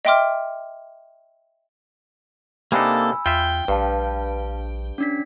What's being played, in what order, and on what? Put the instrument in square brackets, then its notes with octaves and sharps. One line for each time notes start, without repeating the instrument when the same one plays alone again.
[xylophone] D#5 E5 G5 C6 D6 F6
[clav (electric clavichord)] C3 D4 D#4 [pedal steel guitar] A#3 A4 [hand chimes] G#5 B5 E6
[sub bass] E2 [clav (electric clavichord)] F4 E5 [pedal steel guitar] G5
[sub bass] A#1 [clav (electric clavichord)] G2 [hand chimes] B4 F5 A5
[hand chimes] C#4 D4 B6